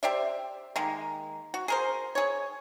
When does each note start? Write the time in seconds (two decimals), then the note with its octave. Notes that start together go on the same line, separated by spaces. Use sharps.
0.03 G4 C5 D5 E5
0.76 D#3 G#3 A#3
1.54 F#4
1.68 G#4 A#4 C5
2.15 G#4 C#5